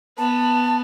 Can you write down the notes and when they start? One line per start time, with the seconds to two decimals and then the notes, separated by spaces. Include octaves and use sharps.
0.18 B3 A5